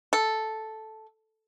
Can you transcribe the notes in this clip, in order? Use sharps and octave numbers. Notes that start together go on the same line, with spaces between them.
A4